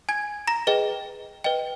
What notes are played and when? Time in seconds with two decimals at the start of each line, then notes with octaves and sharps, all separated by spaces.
0.09 G#5 G#6
0.47 A#5 A#6
0.67 G#4 B4 D#5 G5
1.44 B4 D#5 G5